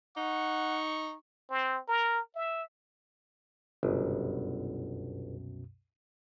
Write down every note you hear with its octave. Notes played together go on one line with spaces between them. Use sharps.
D#4 F#5 C#6
C4
A#4
E5
G1 C2 F#2 B2